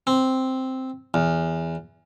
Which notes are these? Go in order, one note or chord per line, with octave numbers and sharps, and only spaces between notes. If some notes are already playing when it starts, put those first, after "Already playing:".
C4
E2